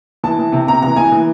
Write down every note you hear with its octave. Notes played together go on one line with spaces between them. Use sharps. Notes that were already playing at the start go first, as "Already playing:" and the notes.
E3 A5
E3
C3
C3 A#5
E3 A#5
E3 G#5
E3